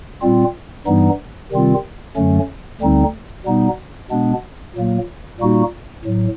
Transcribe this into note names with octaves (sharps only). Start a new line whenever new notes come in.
A#2 G3 C4 F4
G2 E3 G3 B3 D#4
C3 D#3 G3 C4 F4
F#2 D3 F#3 A3 C#4
D2 D3 G3 C4 D#4
B2 G3 B3 D#4
B2 G#3 B3 D4
A#2 F#3 A#3
A#2 G3 A#3 D#4 F#4
A2 F#3